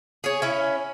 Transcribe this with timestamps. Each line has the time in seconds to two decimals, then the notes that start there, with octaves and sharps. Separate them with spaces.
0.24 G#4 C#5
0.42 C#4 E4